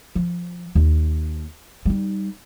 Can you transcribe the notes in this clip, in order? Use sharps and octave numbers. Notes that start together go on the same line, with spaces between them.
F3
D#2
G3 D#4